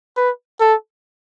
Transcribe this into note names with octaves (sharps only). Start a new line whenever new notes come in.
B4
A4